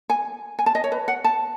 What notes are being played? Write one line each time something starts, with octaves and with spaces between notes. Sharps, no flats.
G#5
G#5
A5
D#5
C#5
B4
F#5
A5